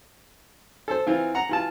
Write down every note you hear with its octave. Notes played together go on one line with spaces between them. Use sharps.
A4 C5
E3 C4 F4
F#5 A#5
E3 F4 A5